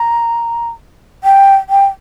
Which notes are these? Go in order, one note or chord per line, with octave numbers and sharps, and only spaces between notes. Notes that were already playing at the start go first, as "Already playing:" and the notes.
Already playing: A#5
G5
G5